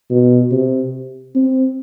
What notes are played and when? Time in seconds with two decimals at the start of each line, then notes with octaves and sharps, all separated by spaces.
0.11 B2
0.52 C3
1.35 C4